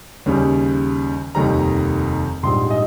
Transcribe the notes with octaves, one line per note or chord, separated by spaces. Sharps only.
D#2 C#3 G3
F1 D#2 D#3 G3 A#5
A#1 G#2 G3 C6
D#5